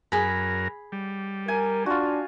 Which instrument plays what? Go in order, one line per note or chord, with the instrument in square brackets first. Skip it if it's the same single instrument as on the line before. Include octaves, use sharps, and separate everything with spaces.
[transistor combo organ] F#2 A#4 [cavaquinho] G#4 B5
[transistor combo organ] G3
[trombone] A#4 [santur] G#5
[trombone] D4 [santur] F4 F#4